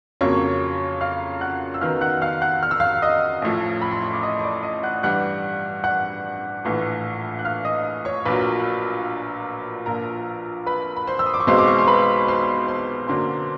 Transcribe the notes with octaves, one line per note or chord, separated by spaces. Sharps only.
F2 C#3 F#3 A#3 C#5 C#6
F5 F6
F#5 F#6
E6
F#2 D#3 F#3 B3 F5 F6
F#5 F#6
F5 F6
F#5 F#6
F6
E6
F5 F6
D#5 D#6
A1 A2 F3
B5
C6
C#6
D6
D#5 D#6
C#6
D5 D6
D#5 D#6
F#5 F#6
G2 E3 G3 F#5 F#6
F#5 F#6
A#1 A2 E3
F#6
F5 F6
D#5 D#6
C#5 C#6
A#1 A#2 F#3 B4 B5
A#1 A#2 F3 A#4 A#5
B4 B5
B5
C5 C6
E6
D#6
D6
C#6
B1 B2 G#3 C4 C5 C6
D6
C#6
C6
B4 B5
C5 C6
C5 C6
F#2 D3 F#3 A#3 C5 C6